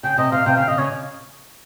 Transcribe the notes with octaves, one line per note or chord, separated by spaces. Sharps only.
C#3 G5
C3 D#5
C3 F5
C3 G5
C#3 F5
C#3 D#5
C#3 C#5